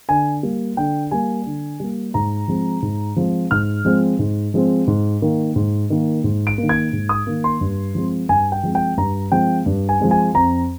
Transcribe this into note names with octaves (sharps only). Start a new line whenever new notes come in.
D3 G#5
G3 A#3
D3 G5
G3 A#3 G#5
D3
G3 A#3
G#2 A#5
F3 G#3 C4
G#2
F3 G#3 C4
G#2 F6
F3 G#3 C4
G#2
F3 G#3 C4
G#2
D#3 A#3
G#2
D#3 A#3
G#2
D7
D#3 A#3
G#6
G#2
D#6
D#3 A#3
C6
G2
F3 G#3 C4
G2 G#5
G5
F3 G#3 C4
G5
G2 A#5
F3 G#3 C4 G5
G2
G#5
F3 G#3 C4
G#5
F2 A#5